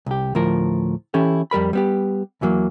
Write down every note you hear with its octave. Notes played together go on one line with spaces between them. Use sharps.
C2 G4
D2 A2 F3 A#4
E3 C#4 E4 G4 A4
F2 G3 A#4 B5
G3 B3 G4
E2 E3 F#3 A#3